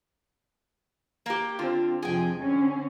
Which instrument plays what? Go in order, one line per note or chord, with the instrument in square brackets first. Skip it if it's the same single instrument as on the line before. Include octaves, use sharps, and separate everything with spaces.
[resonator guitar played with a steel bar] A#3 G4
[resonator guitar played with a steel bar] D3 [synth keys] C4 F4
[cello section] F2 C3 F3 [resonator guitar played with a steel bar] G#4 G5 [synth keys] G#5
[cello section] D3 C4 C#4